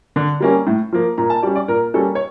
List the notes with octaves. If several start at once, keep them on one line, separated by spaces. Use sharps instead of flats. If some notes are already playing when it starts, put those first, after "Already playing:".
D3
G3 A#3 C#4
A2
F3 A#3
A#2 A#5
A5
G3 C#4 D5
D5
A#2 A#4
G3 A#3 C#4 A4
C#5